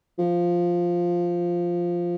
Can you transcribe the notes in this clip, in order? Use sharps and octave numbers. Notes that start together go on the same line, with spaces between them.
F3